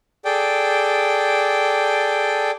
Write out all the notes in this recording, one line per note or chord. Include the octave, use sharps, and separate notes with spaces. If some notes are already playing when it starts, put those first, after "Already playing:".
G#4 A4 D5 G5